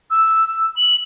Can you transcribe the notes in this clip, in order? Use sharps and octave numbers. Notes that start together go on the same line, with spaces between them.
E6
E6
F#7